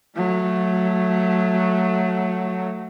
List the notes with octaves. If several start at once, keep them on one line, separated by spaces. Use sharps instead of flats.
F#3 A3